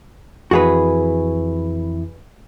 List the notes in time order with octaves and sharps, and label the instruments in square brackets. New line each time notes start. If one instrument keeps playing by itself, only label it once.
[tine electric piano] F2 E3 E4 [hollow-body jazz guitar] F#4 G#4 B4